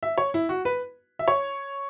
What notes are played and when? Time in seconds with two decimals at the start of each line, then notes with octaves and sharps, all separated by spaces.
0.03 E5
0.18 C#5
0.34 E4
0.49 F#4
0.65 B4
1.19 E5
1.28 C#5